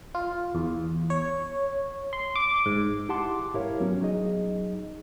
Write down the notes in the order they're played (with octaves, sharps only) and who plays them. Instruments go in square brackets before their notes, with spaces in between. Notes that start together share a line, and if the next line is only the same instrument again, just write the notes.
[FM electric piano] F4
E2
C#5
C6
D6
G#2
[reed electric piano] E4 G4 F#5 A5 C6 D6
G#2 E4 G4 A#4 C#5 F5
F#3 B3 C#4 F#4
F#3 D#4 G#4 D#5